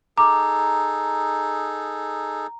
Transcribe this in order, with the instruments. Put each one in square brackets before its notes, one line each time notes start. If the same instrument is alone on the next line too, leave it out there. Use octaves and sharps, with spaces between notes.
[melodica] D#4 G#4 A4 [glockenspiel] A#5 [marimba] D6